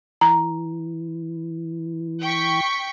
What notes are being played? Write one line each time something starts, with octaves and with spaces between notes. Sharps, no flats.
E3 A#5
G5 C#6 B6